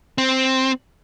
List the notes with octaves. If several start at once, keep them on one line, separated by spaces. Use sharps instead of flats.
C4